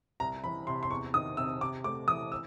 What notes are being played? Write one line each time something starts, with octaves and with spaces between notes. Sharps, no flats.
C2 A#5
E3 B5
C3 C6
C6
E2 C#6
D#3 D#6
C3 E6
C3 D6
A3 D6
E3 D#6
E6